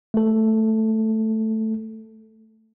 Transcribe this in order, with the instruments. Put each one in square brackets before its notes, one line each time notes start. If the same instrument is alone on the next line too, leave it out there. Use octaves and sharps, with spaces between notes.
[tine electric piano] A3 A4